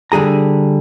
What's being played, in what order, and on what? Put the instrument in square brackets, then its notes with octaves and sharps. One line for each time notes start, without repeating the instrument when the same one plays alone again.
[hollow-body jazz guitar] D3 G3 G#4 A#5